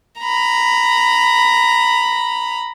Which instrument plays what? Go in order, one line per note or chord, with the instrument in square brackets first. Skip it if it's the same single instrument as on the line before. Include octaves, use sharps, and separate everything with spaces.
[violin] A#5 B5